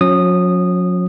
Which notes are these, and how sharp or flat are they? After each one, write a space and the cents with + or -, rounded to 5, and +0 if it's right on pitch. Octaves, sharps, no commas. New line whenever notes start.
F#3 -40 C#4 +0 D#6 -15